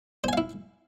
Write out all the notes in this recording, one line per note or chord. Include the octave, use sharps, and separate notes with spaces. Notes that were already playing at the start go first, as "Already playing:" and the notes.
E4 C5 F5 G#5